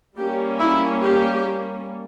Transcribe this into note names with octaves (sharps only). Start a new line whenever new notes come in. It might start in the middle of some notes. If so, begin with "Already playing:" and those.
G3 A#3 C#4 G4
E4
G4